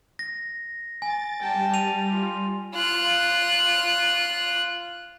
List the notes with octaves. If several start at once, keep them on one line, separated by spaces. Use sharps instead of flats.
A#6
G#5 A6
G3 G5 A5
D#7 F7
F4
F4 F#6